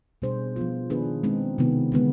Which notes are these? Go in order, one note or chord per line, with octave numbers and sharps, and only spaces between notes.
B2 G3 D4 G#4 C5
F3 B3 F4
D#3 B3 D4 G#4 B4
G#3 C4 D#4
C3 D#3 B3
D3 G#3 B3